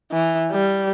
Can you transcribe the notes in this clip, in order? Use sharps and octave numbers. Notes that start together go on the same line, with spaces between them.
E3
G3